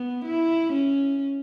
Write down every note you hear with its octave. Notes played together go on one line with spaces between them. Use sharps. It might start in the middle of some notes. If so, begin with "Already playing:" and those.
Already playing: B3
E4
C#4